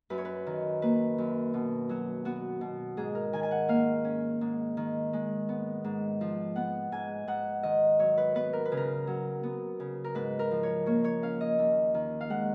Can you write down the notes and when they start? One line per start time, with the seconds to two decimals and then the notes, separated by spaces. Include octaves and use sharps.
0.10 F#2 B4
0.18 C#5
0.25 B4
0.46 D#3
0.82 A#3 B4
1.18 F#2
1.54 B2
1.89 F#3 F#4
2.25 B3 F#4
2.61 B2
2.97 G#2 G#4
3.15 A#4
3.33 D#3 G#5
3.43 G#5
3.51 F#5
3.68 A#3 F5
4.05 C#4
4.41 G#2
4.77 D#3
5.13 G#3
5.49 B3
5.84 G#2
6.21 F3
6.56 B3 F#5
6.92 G#2 G#5
7.27 G#2 F#5
7.63 D#3 D#5
7.99 F#3 C#5
8.17 B4
8.35 B3 B4
8.53 A#4
8.65 B4
8.72 C#3
8.77 A#4
9.07 F#3
9.43 B3
9.80 C#3
10.04 A#4
10.15 G#2 B4
10.39 A#4
10.51 F3
10.63 C#5
10.86 A#3 C#5
11.04 C#5
11.22 C#4 F5
11.41 D#5
11.59 D#2
11.94 D#3
12.21 F5
12.30 G#3 F#5